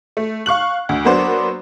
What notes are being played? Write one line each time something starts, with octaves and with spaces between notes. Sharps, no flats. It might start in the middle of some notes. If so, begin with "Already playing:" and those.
A3
F5 C#6 F#6 F#7
D2
F#3 A#3 B3 D4 C5